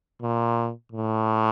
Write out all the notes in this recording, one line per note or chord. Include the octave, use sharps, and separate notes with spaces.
A#2
A2